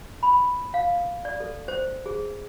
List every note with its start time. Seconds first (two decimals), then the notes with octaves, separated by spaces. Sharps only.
0.23 B5
0.74 F5
1.25 D5
1.40 A4
1.68 C5
2.06 G#4